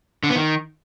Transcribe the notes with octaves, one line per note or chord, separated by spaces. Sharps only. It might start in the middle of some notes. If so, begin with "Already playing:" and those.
D3
B3
D#3